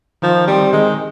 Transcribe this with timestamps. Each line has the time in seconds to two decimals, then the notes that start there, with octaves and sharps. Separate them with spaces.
0.22 D#3 F3
0.47 G3 C4
0.73 D#3 G#3